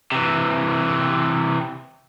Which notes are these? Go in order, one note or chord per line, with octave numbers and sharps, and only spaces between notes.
C3 E3